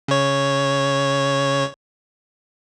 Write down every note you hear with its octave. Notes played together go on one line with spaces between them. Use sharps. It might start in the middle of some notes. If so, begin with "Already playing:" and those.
C#3 C#5